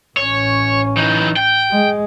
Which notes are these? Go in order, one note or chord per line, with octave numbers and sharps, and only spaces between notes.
A1 C#4 C#5
E3 D#4
G5
G#3